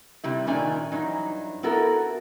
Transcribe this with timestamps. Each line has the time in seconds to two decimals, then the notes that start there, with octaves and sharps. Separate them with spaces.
0.24 C3 G3 E4
0.47 A#2 D#3 C#4 D4 E5 G#5
0.91 G2 E3 F#3 D#4
1.63 B3 E4 F#4 A4 A#4